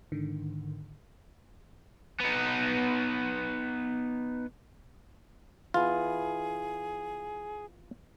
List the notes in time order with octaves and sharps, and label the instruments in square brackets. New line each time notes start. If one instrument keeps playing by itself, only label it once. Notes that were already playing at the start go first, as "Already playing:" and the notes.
[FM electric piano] G#2 D3 D#3
[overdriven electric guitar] B3 D#4
[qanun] E3 B3 [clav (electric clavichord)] F4 [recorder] G#4